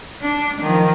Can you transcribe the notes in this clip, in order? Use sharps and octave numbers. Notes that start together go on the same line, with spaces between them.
D4
D#3 F3